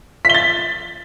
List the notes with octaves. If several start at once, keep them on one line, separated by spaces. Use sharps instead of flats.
A6 B6 G7